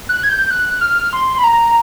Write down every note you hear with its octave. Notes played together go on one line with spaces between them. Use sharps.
F#6
G#6
G6
F#6
F6
C6
B5
A#5